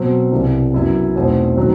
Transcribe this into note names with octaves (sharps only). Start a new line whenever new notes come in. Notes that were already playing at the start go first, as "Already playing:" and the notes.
Already playing: B2 F#3 C4
C2 C3 E3
F#2 F#3 B3 E4
E2 B2 A3 C4 D#4
D#3 F#3 C4 D#4